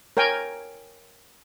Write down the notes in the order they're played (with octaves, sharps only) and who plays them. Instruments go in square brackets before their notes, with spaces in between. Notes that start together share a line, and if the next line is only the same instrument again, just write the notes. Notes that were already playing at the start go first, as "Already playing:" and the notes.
[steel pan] A#4 C#5 G5 G#5